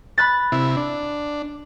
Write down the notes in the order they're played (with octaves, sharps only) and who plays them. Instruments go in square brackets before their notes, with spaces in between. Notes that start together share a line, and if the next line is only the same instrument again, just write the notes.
[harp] B5 F#6 A6
[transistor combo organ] C3 E4
D4